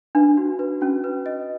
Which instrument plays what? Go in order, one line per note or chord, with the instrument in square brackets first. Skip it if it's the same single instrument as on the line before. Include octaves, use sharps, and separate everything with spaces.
[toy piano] D4 [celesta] B4
[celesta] F#4
B4
[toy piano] C#4 [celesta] F#4
[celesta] B4
D#5